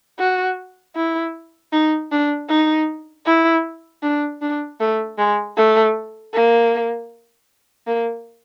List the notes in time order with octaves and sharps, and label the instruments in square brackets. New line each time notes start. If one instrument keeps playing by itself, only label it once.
[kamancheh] F#4
E4
D#4
D4
D#4
E4
D4
D4
A3
G#3
A3
A#3
A#3